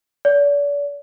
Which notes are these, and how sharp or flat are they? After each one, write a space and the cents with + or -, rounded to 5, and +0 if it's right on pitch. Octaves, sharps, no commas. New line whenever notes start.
D5 -40